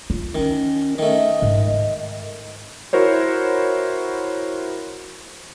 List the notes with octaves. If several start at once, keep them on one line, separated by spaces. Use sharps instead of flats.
F4
D#3 C#4
D#3 A3 D#5
G#2
E4 F#4 A#4 C5 C#5